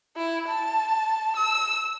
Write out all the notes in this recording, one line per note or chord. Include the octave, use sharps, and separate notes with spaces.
E4
A5
E6